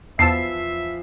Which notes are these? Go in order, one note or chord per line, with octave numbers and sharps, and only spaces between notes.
E2 E3 F3 F4 E5 A5 E6 C7